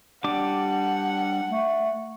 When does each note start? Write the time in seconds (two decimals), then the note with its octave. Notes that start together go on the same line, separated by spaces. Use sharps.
0.24 G3 D4 F#5 D6
1.50 A3